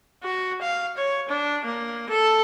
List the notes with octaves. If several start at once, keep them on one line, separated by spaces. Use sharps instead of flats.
F#4
F5
C#5
D4
A#3
A4